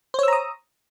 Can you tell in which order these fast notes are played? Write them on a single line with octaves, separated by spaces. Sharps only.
C5 C#5 E6 A#5 D#6